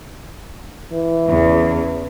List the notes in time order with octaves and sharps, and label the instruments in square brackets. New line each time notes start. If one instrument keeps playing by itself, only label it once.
[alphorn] E3
[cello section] E2 C#3